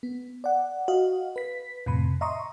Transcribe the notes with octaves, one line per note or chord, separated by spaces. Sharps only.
B3
D5 F#5
F#4 D#5 F5
B4 B6
F2 A2 C3 B5
D#5 E5 A#5 C6 C#6 D#6